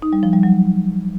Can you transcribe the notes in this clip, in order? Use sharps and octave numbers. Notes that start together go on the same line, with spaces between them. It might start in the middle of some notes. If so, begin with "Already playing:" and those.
D#4
G3
F3
G3
F#3